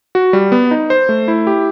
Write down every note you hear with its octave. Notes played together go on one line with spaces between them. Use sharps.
F#4
G3
B3
D#4
C5
A3
E4
G4